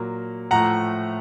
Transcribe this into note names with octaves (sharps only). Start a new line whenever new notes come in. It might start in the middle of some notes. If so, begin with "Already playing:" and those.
Already playing: A#2 F#3 A#3
A2 F3 A3 F#5 A#5